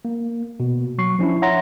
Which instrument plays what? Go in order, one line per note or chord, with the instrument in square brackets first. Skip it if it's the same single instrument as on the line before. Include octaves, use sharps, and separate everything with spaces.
[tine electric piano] A#3
B2
F#3 C#6 C7
F3 C#4 D4 E4
C#5 E5 F#5 A#5 C6 A#6